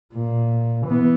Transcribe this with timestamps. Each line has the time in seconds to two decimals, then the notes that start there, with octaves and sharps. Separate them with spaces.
0.14 A#2
0.86 E3 B3